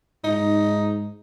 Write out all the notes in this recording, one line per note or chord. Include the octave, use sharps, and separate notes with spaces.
G#2 D#4